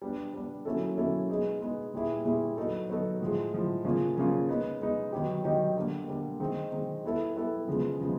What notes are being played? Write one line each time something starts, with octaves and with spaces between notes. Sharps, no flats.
G3 B3 D4
G3 B3 D4
F#3 A#3 C#4 E4 A4
F#3 A#3 C#4 E4 A4
G#3 B3 D#4 G#4
G#3 B3 D#4 G#4
A#2 G3 B3 E4 G#4
A#2 G3 B3 E4 G#4
F#3 B3 D#4 F#4 A4
F#3 B3 D#4 F#4 A4
A2 F3 G#3
A2 F3 G#3
C#3 F3 A#3 C#4 F4
C#3 F3 A#3 C#4 F4
G#3 B3 D#4
G#3 B3 D#4
D#3 F#3 B3 D#4 G4
D#3 F#3 B3 D#4 G4
D3 G3 A#3
D3 G3 A#3
D#3 G#3 C4 D#4
D#3 G#3 C4 D#4
G3 B3 E4 A4
G3 B3 E4 A4
C#3 F3 G#3 B3
C#3 F3 G#3 B3